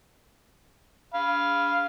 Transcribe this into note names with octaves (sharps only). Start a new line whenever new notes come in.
F5 B5